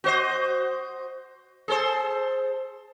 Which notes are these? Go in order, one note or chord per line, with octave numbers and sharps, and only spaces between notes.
F#4 C5 D#5
G#4 A4 C5